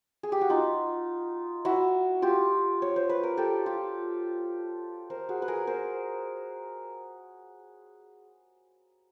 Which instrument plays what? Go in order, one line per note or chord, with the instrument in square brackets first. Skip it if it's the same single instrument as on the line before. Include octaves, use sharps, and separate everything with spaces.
[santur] G#4
G4
F#4
D#4 F4
E4 F#4
F4 G4
C#5
C5
B4
A#4
G4 A4
F4 G4
A#4 C5
F#4 G#4
B4
G#4 A#4
A#4 C5